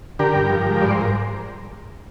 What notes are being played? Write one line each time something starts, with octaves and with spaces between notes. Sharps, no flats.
D3 G4 A#4
G2
F3
G#2
G2 D5
C5
A#4